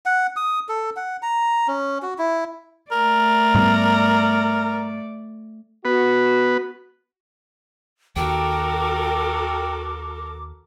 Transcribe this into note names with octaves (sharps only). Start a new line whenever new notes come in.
F#5
D#6
A4
F#5
A#5
C#4
F#4
E4
A3 A#4 D5
G#2 G3 B3
B3 F#4 B4
D#2 D#3 F#4 A4 A#4 G5 D6